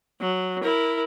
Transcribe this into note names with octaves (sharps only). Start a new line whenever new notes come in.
F#3
E4 A#4